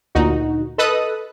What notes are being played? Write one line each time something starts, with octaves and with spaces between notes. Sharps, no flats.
D2 A#2 D#4 F#4
A4 B4 D#5 D#6 F#6